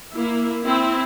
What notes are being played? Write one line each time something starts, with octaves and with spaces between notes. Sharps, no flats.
A#3 E4
C4 E4